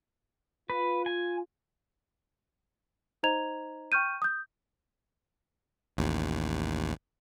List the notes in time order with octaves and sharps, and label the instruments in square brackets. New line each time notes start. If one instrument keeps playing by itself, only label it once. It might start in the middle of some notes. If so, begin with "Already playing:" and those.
[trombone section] F4 [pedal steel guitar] B4
[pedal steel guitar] G#5
[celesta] D#4 C5 D#5 A#5 G#6 F7
G5 C#6 F6 G6 D#7
D#6 G6
[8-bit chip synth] A1 D#2